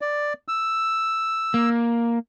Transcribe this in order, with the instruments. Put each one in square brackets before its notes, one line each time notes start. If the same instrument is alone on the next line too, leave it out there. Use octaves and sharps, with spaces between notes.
[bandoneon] D5
E6
[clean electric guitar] A#3